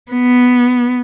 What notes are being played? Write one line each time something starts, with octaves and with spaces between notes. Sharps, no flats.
B3